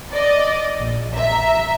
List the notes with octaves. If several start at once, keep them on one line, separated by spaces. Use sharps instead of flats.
D5 D#5
A#1
E5 A#5